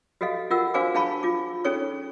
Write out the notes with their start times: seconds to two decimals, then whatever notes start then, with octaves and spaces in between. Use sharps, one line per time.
0.21 F#4 G4 A4 D#5 F5
0.50 F4 G4 A#4 F#5 E6
0.74 D4 F#4 C5 F5 G#5 D6
0.94 D4 G#4 F5 A5 B5 C#6
1.23 F4 D6
1.65 C#4 D#4 G#4 A4 C#5 C#6